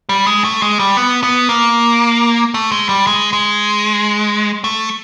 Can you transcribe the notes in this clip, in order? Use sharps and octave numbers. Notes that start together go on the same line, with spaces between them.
G3
G#3
A3
G#3
G3
B3
B3
A#3
A3
G#3
G3
G#3
G#3
A3